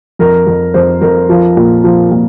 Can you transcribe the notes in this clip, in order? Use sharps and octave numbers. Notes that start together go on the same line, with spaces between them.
F2 A#4
F2
F2 C5
F2 A#4
F3
A#2
F3
A#2